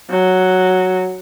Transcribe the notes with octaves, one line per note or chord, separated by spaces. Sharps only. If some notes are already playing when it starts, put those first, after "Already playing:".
F#3